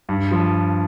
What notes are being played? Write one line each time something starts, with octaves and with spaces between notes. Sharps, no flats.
G2
F3